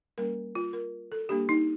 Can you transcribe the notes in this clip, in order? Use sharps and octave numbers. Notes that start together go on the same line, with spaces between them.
G3 A#3 C#4 A#4
F4
A#4
A4
G3 A#3 D4 G4
D#4